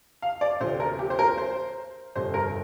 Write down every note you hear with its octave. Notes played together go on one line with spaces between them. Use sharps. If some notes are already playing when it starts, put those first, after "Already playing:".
F5
D5
D2 C3 F3 C5
A#4
G4
C5
A#4
C5
G1 F2 C3 C5
A#4